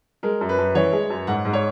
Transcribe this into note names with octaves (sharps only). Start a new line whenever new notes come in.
G#3 A#4
F#2
B4
F#2
E3 C#5
G#3
F#2
G#2 F#5
G#2
C#5